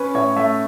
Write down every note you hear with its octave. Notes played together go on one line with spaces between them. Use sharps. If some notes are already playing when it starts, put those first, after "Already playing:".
Already playing: C#4 B4
A2 C#5
A3 E5